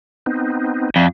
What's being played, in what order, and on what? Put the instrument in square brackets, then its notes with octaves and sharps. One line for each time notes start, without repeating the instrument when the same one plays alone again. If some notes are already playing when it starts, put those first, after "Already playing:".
[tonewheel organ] B3 C4 D#4
[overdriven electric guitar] F2 [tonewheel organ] D5 E5